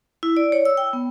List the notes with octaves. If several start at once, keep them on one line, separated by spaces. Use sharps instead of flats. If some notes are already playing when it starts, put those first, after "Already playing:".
E4
D5
C#5
E6
G5
B3